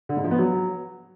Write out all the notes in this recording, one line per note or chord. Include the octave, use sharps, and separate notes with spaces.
D3
G#2
F3
B3
F#3